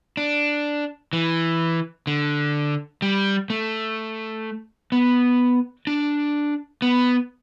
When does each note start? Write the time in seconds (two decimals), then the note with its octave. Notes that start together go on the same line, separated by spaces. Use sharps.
0.17 D4
1.13 E3
2.07 D3
3.02 G3
3.50 A3
4.92 B3
5.87 D4
6.82 B3